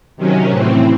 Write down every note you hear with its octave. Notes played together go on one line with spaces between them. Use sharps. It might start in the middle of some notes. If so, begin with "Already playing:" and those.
C3 D#3 F#3 C#4
A2 E3 C4